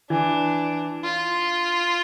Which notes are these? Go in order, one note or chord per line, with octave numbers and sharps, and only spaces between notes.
E3 D4
F4